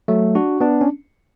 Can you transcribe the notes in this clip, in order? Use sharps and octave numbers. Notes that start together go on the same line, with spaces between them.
F#3 A3
D4 F#4
B3 D4
C#4